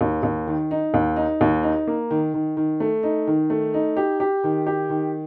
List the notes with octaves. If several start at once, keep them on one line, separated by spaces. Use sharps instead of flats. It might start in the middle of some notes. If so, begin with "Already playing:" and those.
D#2
D#2
D#3
D#4
D#2
D#4
D#2
D#4
A#3
D#3
D#3
D#3
A3
D#4
D#3
A3
D#4
G4
G4
D#3
G4
D#3